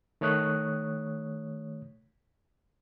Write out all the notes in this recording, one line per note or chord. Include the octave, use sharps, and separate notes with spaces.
D#3 A3 C#5 D#6 F#6